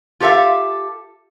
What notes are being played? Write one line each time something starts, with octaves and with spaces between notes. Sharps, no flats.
F4 G4 A4 C5 E5 F5